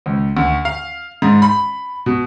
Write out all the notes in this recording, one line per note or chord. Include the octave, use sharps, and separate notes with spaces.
C#2
D2
F5
G#2
B5
B2